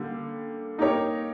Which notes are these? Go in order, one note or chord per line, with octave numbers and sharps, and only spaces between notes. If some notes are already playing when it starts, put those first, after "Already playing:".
Already playing: D3 G3 A#3
A#3 D#4 G4 A#4 C#5